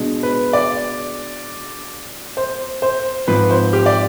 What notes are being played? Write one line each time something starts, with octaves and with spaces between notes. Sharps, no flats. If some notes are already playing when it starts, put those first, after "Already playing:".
Already playing: B2 G#3 D4
B4
D5
C5
C5
G#2 F3 C4 B4
C5
G4
D5